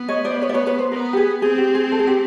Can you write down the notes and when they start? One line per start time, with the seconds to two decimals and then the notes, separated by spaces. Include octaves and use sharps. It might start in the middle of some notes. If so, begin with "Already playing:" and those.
Already playing: B3
0.08 C#5 D#5
0.25 C5 D5
0.42 B4 C#5
0.49 D5
0.54 B4 C#5
0.67 B4 C#5
0.79 C5
0.92 B3 A#4
1.13 G4
1.17 G#4
1.42 C4 G#4
1.58 G4
1.75 G#4
1.92 A4
1.99 G#4
2.07 G4